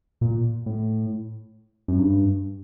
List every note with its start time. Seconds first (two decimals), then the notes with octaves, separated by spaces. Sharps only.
0.21 A#2
0.66 A2
1.88 F#2
1.98 G2